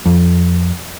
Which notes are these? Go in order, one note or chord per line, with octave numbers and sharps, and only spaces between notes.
F2